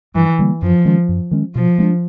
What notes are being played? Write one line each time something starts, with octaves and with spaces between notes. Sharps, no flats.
G2 E3
D3 G3 A#3
F#2 F3
D#3 G#3 C#4
F#2
D#3 G#3 C#4
B2 F3
G#3 B3 D4